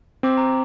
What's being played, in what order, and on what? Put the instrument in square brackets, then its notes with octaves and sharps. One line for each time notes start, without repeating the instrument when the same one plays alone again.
[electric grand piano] C4 [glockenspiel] D6
[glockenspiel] A#5